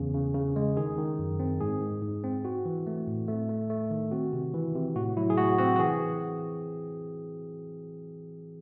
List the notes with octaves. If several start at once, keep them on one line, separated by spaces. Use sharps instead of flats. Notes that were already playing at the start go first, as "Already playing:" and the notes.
Already playing: E2 C#3
C#3
C#3
G#3
D#3 G#4
D#3
F#2
C4
G#2 G#4
G#2
G#2
C4
C4 F#4
E3
A3
A2
A3
A3
A3
D#3
C4 F#4
C3
E3
C3
A2 F#4
F#3 E4
G#4
A2 F#4
C4 F#4
F#4
E3 G#4